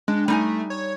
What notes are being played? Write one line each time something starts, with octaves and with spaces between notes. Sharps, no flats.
G#3 D4
G3 A3 D#4 G#5
C#5